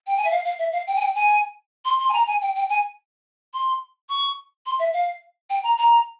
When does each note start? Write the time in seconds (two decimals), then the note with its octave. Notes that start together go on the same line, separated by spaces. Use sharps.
0.07 G5
0.17 G#5
0.25 E5
0.31 F5
0.45 F5
0.59 E5
0.73 F5
0.87 G5
0.96 G#5
1.01 G5
1.15 G#5
1.85 C6
1.99 C6
2.09 G#5
2.13 A#5
2.27 G#5
2.41 G5
2.55 G5
2.69 G#5
3.54 C6
4.09 C#6
4.66 C6
4.79 E5
4.93 F5
5.50 G5
5.63 A#5
5.78 A#5